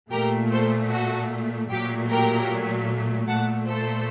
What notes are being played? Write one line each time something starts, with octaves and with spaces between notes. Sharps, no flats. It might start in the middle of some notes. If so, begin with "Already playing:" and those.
A#2 A3 G4 A#4
A4 C5
F#4 A4
A#2 F#3 A3 G4
G4 A#4
A#2 A3 F#5 A5
A4 C5